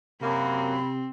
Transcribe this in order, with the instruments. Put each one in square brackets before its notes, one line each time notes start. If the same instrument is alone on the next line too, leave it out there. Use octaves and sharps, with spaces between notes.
[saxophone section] F#2 A#3 [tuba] C3 [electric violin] C4 [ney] B5